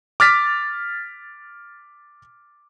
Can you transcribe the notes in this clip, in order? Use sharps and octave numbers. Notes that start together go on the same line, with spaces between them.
D6 F6 A6 B6